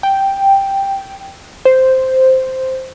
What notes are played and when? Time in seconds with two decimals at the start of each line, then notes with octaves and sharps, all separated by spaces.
0.03 G5
1.65 C5